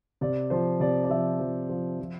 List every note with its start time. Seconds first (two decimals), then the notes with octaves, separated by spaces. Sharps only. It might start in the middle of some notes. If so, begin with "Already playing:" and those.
0.21 C3 D5
0.50 F3 C5
0.80 C3 D5
1.04 D5
1.09 F3 E5
1.40 F3
1.69 F3
1.99 F3